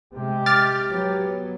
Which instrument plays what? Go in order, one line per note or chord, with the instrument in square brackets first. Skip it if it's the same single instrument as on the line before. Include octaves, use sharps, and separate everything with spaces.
[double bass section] C3 G#3 [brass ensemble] G4
[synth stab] D6 F6 A6
[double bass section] F#3 B3